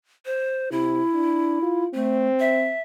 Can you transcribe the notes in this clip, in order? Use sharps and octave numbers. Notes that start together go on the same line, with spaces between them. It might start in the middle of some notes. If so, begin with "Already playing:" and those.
C5
C3 E4
D4
F4
A3 C4
E5